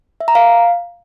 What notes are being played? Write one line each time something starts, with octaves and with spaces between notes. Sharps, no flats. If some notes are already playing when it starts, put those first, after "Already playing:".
E5
A#5
F5